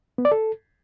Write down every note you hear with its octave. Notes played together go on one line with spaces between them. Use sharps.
B3
D5
A4